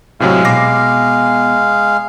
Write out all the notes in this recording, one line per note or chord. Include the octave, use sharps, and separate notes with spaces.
A2 C3 F#3 G#3 F5
B2 D6 A#6 C7